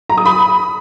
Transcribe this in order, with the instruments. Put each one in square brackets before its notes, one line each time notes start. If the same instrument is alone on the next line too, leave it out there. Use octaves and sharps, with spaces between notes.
[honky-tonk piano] A#5
D#6
B5